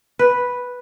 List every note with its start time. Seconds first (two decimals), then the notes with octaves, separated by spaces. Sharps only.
0.19 B4